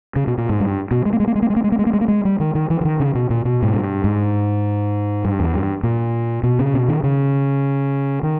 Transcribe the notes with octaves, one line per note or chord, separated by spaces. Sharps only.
C#3
B2
A#2
G#2
G2
B2
G#3
A#3
G#3
A#3
G#3
A#3
G#3
A#3
G#3
A#3
G#3
A#3
G#3
A#3
G#3
G3
D#3
D#3
E3
E3
D#3
C#3
B2
A#2
B2
G#2
G2
G#2
G2
E2
G2
A#2
B2
C#3
B2
D#3
C#3
D#3